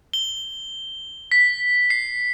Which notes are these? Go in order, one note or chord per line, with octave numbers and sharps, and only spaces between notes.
G7
B6
C7